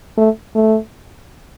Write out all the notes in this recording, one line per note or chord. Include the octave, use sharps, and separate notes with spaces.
A3
A3